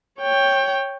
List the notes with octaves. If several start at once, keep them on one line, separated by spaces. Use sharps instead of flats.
C#5 G5